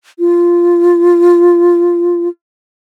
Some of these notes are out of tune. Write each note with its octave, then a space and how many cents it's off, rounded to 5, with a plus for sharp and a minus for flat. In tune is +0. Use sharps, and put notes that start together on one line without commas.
F4 -10